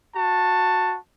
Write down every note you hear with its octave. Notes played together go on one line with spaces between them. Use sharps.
F#4 A5